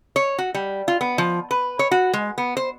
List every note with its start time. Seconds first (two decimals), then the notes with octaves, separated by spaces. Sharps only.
0.16 C#5
0.38 F#4
0.55 G3
0.88 F4
1.01 B3
1.18 F3
1.51 B4
1.79 C#5
1.91 F#4
2.13 G#3
2.38 B3
2.57 C5